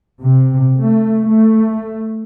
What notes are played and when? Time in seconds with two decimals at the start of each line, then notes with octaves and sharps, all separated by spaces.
0.21 C3
0.80 A3
1.28 A3